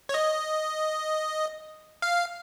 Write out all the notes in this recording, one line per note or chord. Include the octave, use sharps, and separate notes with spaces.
C#5
D#5
F5